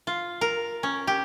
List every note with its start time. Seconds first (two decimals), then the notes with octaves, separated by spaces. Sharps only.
0.07 F4
0.41 A#4
0.83 C#4
1.07 G4